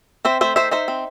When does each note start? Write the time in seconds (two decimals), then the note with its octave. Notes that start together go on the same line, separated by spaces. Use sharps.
0.25 C4 C5 E5
0.41 A3 C5 E5
0.56 D#3 C5 E5
0.71 D#4 C5 E5
0.88 C4